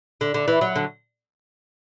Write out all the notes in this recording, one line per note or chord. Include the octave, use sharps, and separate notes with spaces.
D3
D3
E3
F#3
D3